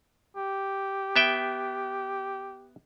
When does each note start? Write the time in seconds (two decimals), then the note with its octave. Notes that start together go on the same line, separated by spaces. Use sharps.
0.36 G4
1.16 B3 E5 G5